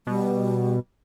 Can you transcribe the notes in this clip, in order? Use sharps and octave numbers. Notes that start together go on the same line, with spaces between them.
B2 G3